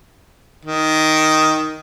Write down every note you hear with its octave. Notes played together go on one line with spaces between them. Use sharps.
D#3